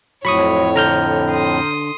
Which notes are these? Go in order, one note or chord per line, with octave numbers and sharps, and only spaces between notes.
F2 A2 F#3 C#5 B5 C#6 D#6
D3 A#5 F6 G6
C6 D#6